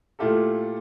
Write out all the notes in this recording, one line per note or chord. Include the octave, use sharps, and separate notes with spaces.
A#2 A3 E4 F4 G4 A4